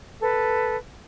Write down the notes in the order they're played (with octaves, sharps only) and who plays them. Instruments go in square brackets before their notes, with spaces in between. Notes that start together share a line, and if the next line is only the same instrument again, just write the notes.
[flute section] A4 B4